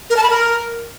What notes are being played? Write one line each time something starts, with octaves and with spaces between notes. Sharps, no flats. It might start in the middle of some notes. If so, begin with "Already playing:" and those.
A#4
A5
B5
A#4